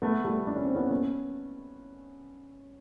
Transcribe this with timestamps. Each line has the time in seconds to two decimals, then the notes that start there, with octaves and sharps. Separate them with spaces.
0.02 A3 B3
0.24 G3 A3
0.47 D4
0.56 C#4
0.65 C4
0.75 B3 C#4
0.91 B3 C#4